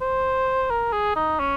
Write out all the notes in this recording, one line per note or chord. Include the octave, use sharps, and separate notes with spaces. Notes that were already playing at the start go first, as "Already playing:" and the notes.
C5
A#4
G#4
D#4
C#4